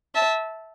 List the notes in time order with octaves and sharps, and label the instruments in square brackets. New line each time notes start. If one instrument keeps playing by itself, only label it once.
[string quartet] E5 A5